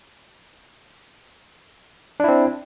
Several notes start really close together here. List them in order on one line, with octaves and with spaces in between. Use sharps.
D4 E4 C4